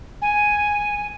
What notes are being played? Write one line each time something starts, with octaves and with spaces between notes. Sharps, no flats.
G#5